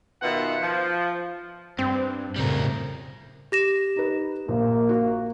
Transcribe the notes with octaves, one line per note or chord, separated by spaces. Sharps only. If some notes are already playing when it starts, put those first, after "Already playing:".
B2 D#3 F4 E5 F#5
F3
G2 C4
F2 A2 C#3 G3 A#4
G4 A#6 E7
D#4 B4
A#1 A#3
F#4